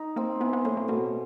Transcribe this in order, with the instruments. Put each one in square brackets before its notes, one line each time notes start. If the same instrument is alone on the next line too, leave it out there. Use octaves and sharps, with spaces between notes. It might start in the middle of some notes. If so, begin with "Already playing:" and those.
Already playing: [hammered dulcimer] D#4
[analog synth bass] A#3 [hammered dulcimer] C4
[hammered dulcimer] E3 [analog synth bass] B3
[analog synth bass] B3
[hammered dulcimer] A2 [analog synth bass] A#3
[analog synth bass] A#3
[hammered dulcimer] B2 [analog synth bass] A#3